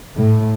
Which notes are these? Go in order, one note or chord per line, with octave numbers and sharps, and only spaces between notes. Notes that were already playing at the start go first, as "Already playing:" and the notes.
A2